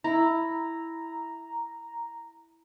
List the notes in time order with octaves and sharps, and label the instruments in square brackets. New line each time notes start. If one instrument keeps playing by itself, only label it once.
[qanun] E4 [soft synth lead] A#5